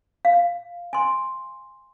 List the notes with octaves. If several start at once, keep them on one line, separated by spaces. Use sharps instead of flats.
F5
G#5 C6